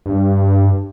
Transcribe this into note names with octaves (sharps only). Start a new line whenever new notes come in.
G2